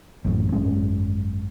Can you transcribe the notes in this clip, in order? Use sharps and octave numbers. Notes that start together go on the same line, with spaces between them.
A1 F#2 A2
G#1 F#2 G#3 C#4